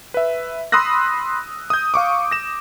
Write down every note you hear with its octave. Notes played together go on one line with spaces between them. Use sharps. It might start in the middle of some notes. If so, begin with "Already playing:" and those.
B4 E5
B5 C6 D#6 E6 F#6 A#6
D#6 G6
F5 C#6 D6
A#6 E7